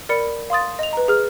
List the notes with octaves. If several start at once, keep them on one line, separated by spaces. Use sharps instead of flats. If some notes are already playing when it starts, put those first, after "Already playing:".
A#4 D5 B5 C#7
F5 C6 D#6 A6
D#5 F7
B4 A#5
G#4 F6